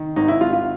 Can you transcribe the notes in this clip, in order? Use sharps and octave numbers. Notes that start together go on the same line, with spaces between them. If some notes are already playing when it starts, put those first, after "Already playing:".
Already playing: D#3
G#1 D#4
E4
G#1 F4
F4